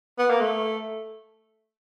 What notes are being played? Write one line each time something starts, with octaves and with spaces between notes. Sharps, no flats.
B3
A#3
A3